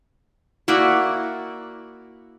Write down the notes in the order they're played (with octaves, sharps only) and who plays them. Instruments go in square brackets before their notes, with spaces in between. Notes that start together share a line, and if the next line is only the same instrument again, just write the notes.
[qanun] A#3 E4 F#4 D5